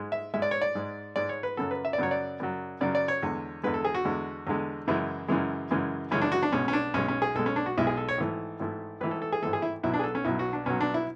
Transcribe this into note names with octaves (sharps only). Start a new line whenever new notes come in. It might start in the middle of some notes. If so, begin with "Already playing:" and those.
Already playing: G#2 G#3
E5
G#2 G#3 E5
D5
C#5
D5
G#2 G#3
G#2 G#3 D5
C#5
B4
F#2 C#3 F#3 A4
B4
E5
D5
F#2 C#3 F#3 C#5
D5
F#2 C#3 F#3
F#2 C#3 F#3 D5
D5
C#5
E2 D3 G#3
E2 D3 G#3 B4
A4
G#4
F#4
E2 D3 G#3
E2 D3 G#3
F#2 C#3 E3 G#3 E4
F#2 C#3 E3 G#3
F#2 C#3 E3 G#3
F#2 C#3 E3 G#3 C#4
D4
F#4
D4
B1 B2 G#3 C#4
C#4
D4
B1 B2 G#3 C#4
C#4
G#4
B1 B2 G#3 A4
C#4
D4
F#4
B1 B2 G#3 E4
G#4
A4
C#5
G#1 G#2 E3 A3
G#1 G#2 E3 A3
G#1 G#2 E3 A3 B4
A4
A4
G#4
G#1 G#2 E3 A3 A4
G#4
E4
B1 B2 F#3 E4
D4
G#4
A4
C#4
B1 B2 F#3 E4
F#4
D4
B1 B2 F#3 C#4
D4
E4